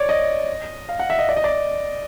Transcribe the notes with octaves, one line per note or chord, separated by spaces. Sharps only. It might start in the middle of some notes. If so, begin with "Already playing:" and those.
Already playing: C#5 D5
D#5
F5
F#5
E5
D#5
D5
D#5
D5